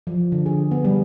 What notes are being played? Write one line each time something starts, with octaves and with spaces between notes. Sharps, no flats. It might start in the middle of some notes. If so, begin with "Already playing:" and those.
F3
D3
G#4
B3
G3